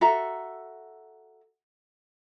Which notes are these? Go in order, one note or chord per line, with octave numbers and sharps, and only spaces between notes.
F#4 A4 E5 A#5